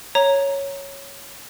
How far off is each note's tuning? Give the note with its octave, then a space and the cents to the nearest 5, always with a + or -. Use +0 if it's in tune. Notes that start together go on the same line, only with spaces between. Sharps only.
C#5 +0 A#5 +0